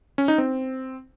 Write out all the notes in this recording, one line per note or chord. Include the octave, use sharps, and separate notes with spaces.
C#4
D#4
C4